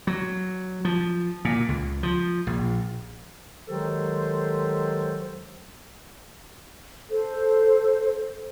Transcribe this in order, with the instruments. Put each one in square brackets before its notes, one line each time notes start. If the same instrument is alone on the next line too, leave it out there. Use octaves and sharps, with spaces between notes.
[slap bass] F#3
F3
A#2
C#2
F3
A#1
[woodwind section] D#3 F#3 G#3 G4 A4 C5
[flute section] A4 C5